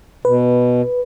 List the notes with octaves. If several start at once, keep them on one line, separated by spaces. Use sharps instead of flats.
B2 B4